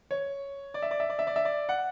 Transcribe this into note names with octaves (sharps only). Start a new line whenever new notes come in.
C#5
D5
E5
D5
E5
D5
E5
D5
E5
D5
F#5